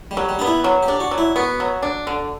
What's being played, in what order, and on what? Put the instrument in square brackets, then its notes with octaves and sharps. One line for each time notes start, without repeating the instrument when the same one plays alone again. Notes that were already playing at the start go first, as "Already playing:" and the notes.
[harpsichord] G3
[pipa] F#3
[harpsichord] G3
[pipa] B3 [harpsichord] D4
[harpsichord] E4
[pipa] F#3
[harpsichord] G4
[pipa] D4
[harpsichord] F#4
[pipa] F#3
[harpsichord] E4
[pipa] B3 [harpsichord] F#4
[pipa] F#3
D4
D3